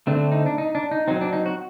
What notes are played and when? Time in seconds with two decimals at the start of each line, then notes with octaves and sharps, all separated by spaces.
0.07 D3 A3 C4 D4
0.32 D#4
0.46 D4
0.58 D#4
0.75 D4
0.91 D#4
1.08 F#3 C4 D#4
1.21 D4
1.33 D#4
1.46 F#4